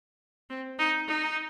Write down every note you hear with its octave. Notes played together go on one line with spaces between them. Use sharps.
C4
D#4
D#4